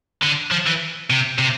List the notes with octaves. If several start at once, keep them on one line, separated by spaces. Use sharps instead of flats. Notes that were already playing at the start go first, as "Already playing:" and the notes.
D3
F3
E3
C3
C3